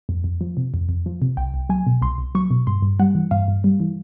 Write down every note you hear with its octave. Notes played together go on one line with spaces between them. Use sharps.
F2
F2
F3
C3
F2
F2
F3
C3
C2 G5
C2
F#3 G#5
B2
C2 C6
C2
F#3 C#6
B2
G2 C6
G2
G3 F#5
E3
G2 F5
G2
G3
E3